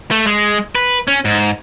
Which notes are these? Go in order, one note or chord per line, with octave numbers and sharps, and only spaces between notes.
A3
G#3
B4
C#4
G#2